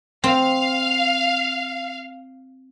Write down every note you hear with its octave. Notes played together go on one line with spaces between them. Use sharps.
C4 F5